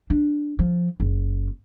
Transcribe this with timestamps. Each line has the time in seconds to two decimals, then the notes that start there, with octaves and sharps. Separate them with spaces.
0.10 D4
0.59 F3
1.00 F#1